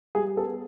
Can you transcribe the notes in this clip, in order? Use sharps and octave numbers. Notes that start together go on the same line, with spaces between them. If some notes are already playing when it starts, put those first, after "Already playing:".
G3 G#4
B3 A4